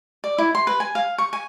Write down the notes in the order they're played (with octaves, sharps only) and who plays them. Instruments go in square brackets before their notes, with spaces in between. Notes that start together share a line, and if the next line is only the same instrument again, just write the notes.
[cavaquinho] D5
E4
C6
B4
G#5
F5
C#6
G#5